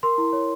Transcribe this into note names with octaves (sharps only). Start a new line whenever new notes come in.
A#4 C6
E4
C#5